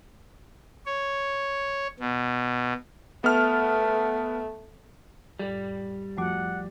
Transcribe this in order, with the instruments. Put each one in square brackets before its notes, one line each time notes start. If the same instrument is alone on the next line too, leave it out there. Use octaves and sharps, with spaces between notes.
[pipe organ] C#5
B2
[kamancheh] A3 [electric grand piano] B3 F6
[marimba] F2 A2 [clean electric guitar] G3
[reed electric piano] F2 F3 D6 [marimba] A3 F#4 [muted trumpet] F#5